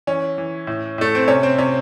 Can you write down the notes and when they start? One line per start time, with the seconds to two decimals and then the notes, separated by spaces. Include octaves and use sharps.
0.07 E3 C#4
0.38 E3
0.67 A2
0.98 A2 A3
1.15 C4
1.28 C3 C#4
1.43 C4
1.58 C3 C#4